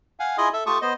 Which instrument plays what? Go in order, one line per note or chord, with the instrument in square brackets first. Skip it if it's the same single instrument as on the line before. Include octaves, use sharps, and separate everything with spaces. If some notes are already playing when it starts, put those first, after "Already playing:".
[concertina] F5 F#5 G#5
E4 F4 G#4 D#5 G#5 D#6
A4 E5
A3 F4 G4 A5 C#6 D#6
B3 C5 D#5